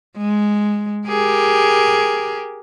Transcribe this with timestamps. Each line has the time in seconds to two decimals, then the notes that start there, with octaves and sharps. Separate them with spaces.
0.17 G#3
1.07 G4 G#4 A#4